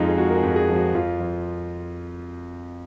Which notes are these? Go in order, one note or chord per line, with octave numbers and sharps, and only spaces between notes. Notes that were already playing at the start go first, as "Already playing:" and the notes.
Already playing: F2 F3 G#3 D#4 F4
G#4
G#3 F#4
A#4
G#4
F2
G#4
F3
F#4
F2 F4
F2